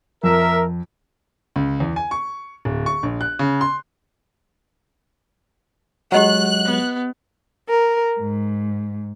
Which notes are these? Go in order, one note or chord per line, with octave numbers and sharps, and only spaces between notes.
F2 A#4 E5
C#2
E2
G#5
C#6
D1
C#6
A#1
F#6
C#3
C6
F#3 G#3 G4 D#5 F#5 F#6
B3
A#4
G#2